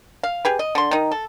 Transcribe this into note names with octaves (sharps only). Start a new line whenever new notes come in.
F5
G4 G#4 B4
D#5
D3 C6
D#3 D#4
A4